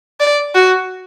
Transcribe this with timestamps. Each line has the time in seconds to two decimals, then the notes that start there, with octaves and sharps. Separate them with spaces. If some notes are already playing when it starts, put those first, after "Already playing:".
0.20 D5
0.55 F#4